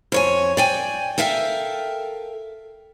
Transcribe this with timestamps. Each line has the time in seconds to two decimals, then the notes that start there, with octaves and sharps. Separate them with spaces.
0.12 F2 C#5 G#5
0.57 D5 G5 G#5
1.18 A4 A#4 E5 F5 G5